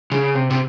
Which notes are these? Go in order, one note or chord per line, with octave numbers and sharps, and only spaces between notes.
C#3
C3
C3